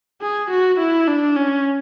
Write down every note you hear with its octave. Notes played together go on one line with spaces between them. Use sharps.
G#4
F#4
E4
D4
C#4